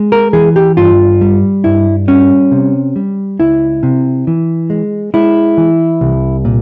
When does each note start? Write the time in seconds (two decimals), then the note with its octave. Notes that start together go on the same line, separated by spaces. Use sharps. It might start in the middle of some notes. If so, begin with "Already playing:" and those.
Already playing: G#3
0.12 A#4
0.33 E3 G#4
0.56 G4
0.77 G2 F4
1.21 G3
1.64 G2 E4
2.08 G3 C#4
2.51 C3
2.96 G3
3.39 C#2 E4
3.83 C3
4.27 E3
4.70 G#3
5.14 G#3 E4
5.57 E3
6.01 C2
6.45 A#2